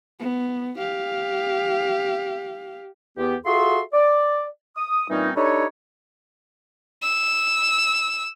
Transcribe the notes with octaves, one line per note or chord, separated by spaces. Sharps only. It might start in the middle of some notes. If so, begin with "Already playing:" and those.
B3
G4 F5
E2 B3 G4
F4 F#4 G#4 A4 E5 C6
D5
D#6
A#2 E3 G3 C4 C#4 D#4
D4 D#4 G4 A4 B4 C#5
E6